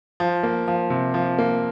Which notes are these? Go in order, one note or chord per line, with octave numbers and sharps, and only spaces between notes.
F3
A#3
F3
C3
F3
A#3